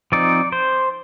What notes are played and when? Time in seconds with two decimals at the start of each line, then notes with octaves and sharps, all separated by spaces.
0.12 F3 C4 D#4 D5
0.52 C5